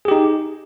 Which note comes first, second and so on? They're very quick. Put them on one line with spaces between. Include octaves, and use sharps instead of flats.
G#4 G4 D#4